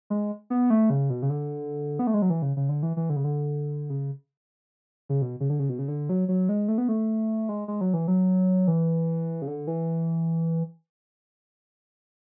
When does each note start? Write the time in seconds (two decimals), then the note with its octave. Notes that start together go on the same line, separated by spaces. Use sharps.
0.10 G#3
0.50 B3
0.70 A3
0.90 C#3
1.10 B2
1.22 C#3
1.30 D3
1.99 B3
2.07 A3
2.14 G#3
2.22 F#3
2.30 E3
2.42 C#3
2.57 C#3
2.69 D3
2.83 E3
2.97 E3
3.10 D3
3.16 C#3
3.24 D3
3.90 C#3
5.09 C#3
5.22 B2
5.40 C#3
5.49 D3
5.59 C#3
5.69 B2
5.79 C#3
5.88 D3
6.09 F#3
6.28 F#3
6.49 G#3
6.68 A3
6.78 B3
6.88 A3
7.49 G#3
7.68 G#3
7.81 F#3
7.94 E3
8.08 F#3
8.68 E3
9.42 C#3
9.47 D3
9.67 E3